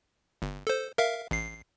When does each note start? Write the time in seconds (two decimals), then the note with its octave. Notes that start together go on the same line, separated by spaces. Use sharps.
0.42 G1
0.67 A4 C5
0.98 A#4 E5 F5
1.31 A1 C7